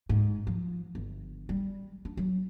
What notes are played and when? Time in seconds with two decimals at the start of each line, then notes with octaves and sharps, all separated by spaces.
0.09 G#2
0.47 F3
0.95 G1
1.49 G3
2.05 D4
2.17 F#3